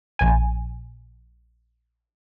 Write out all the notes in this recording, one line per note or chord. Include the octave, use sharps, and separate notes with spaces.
A#1 G#5